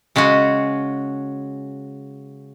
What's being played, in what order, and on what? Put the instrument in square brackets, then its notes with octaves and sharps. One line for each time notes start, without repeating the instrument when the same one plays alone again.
[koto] C#3 G#3 C#4 F#4